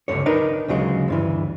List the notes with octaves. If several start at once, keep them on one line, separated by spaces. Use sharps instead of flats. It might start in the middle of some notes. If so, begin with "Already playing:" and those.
C#2 G2 B2 D3 C#5
D4 D#4 A#4 B4 D#5
D2 C#3 F#3 G#3
D2 G2 E3